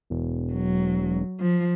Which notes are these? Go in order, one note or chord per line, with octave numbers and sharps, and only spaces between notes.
E1
F#3
F3